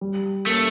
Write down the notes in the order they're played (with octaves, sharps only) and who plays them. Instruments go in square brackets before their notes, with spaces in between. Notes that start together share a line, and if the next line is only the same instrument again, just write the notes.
[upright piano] G3
[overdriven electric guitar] A3 [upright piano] A#3 C#4